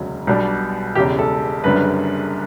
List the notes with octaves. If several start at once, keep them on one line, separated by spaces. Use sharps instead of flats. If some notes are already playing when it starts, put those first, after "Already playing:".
Already playing: E1 D2 C#3 F#3
B1 B2 G3 D4
E1 E2 C#3 G4
A4
F#1 F#2 D3 G3 B4